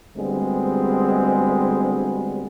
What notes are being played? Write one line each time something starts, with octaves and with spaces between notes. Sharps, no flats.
D2 G3 G#3 B3 C4